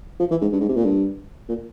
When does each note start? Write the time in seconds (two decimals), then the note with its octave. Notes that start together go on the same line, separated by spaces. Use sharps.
0.20 F3
0.31 E3
0.42 G#2
0.52 G2
0.61 G#2
0.69 C3
0.77 A#2
0.85 G2
1.49 A#2